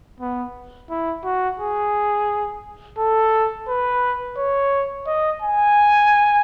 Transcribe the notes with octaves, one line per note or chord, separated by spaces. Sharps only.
B3
E4
F#4
G#4
A4
B4
C#5
D#5
G#5